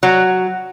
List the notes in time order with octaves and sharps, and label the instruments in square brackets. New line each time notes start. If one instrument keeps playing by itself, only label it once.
[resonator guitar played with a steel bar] F#3